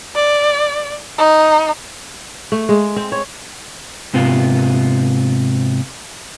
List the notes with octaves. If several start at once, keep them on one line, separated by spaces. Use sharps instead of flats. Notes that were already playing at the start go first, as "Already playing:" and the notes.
D5
D#4
A3
G#3
C4
C#5
G#2 C3 B3 F4